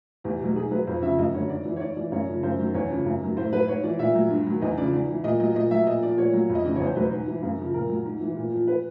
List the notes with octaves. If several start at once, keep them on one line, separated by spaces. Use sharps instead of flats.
E2 G4
B2 F#3
G#2 G#4
D#3 F#3 B4
F2 C5
C#3 F3 E5
F#2 D#5
D3 F#3 C#5
G#2 D5
E3
C#5
G#2 D5
E3 D5
F#2 C#5
C#3 F3
F#2 C5
D#3 F#3
E2 C#5
C#3 F3
F#2
D#3 F#3
A2 C5
F#3 B4
G#2 C#5
E3 D5
A#2 E5
F#3
G2
D#3 F#3
E2 D#5
C#3 F3 D5
G#2
E3
A#2 D#5
F#3 D#5
A#2 D#5
F#3 E5
A#2 D#5
F3 D5
A#2 C#5
F#3
F2
D#5
C#3 E3 D5
E2 C#5
C5
B2 F#3 B4
G#2
E3
F#2
C#3 F3
A#2 A#4
F#3
G#2
E3
A#2
F3
B4